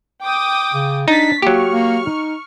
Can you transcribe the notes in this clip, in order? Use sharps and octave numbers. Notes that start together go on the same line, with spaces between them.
G5 D6 D#6
C#3
D4 D#4 A6 B6
F#3 A#3 G4 C#6 F6
A#3
D#4